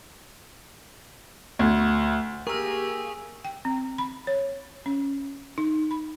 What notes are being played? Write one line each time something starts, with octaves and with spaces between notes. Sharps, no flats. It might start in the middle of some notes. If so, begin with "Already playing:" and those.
D2
A#3 G4 G#4 A#4 C#6 E6
G5
C4
B5
C#5
C#4
D#4
B5